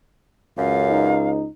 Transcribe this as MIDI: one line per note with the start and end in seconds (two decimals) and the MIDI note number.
0.58 1.46 37
0.58 1.23 42
0.58 1.30 77
0.90 1.49 63